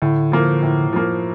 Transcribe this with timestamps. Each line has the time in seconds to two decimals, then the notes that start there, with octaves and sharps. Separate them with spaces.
0.02 A2 D3
0.32 F3 A#3
0.63 A2
0.93 F3 A#3